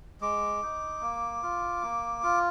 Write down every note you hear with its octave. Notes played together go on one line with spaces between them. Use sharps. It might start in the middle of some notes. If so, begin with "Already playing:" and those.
G#3 D6
D#4
A#3
F4
A#3
F4